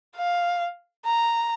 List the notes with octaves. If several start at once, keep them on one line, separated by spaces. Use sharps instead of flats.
F5
A#5